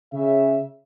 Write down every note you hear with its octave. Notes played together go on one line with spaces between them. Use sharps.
C#3 E5